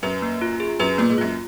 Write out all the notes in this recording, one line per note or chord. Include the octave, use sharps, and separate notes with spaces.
F#2 B4
A#3
F4
G#4
F#2 B4
A#2 A#3
G#2
F#2 F4